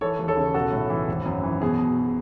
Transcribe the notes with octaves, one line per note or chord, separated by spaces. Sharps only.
E3 A4 C#5
D#2
A4 C#5
C#3
B1 F#4 A4
A2
E3
G#1
F#2
E3
B2 G#4
B2